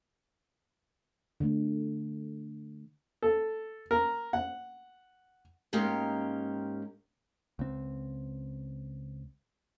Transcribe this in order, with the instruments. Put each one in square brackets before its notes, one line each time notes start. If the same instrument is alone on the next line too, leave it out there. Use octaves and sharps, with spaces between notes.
[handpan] D3 A3
[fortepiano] A4
A#4
F#5
[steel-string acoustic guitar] G#2 G#3 A#3 C#4 G4 F5
[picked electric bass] C#2 C4